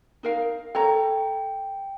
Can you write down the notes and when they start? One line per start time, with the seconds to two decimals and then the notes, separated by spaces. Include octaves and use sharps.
0.23 D#4 A#4 F5
0.75 A4 C#5 G5 A#5